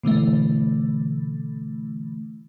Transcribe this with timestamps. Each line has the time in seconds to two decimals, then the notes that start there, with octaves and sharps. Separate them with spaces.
0.03 B2 D3 E3 A3